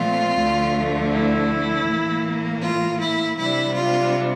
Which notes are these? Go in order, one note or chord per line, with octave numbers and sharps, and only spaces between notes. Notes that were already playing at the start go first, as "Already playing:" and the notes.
Already playing: A#2 F3 A3 C4 F4
D2 D3 F3 A3
E4
A2 E3 A#3
F4
E4
C3 G3 D4 E4
F4